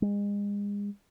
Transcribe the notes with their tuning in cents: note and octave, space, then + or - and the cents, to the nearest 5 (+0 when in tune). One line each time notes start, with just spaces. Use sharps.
G#3 -35